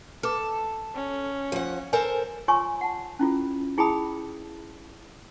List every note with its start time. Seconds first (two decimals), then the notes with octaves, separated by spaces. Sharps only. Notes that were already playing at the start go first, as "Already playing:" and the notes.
0.23 A4 B4 D6
0.95 C#4
1.52 F3 F#5
1.93 A4 A#4 C5 G#5
2.48 F4 C#5 G#5 C6 C#6 E6
2.81 F#5 A5
3.19 C#4 E4 F4 A4
3.78 E4 G#4 G5 A5 B5 D#6